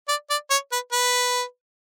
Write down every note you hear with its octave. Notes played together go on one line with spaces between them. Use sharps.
D5
D5
C#5
B4
B4